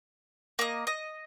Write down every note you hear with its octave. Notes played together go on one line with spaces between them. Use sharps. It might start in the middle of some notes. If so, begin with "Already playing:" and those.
A#3 D#5
D#5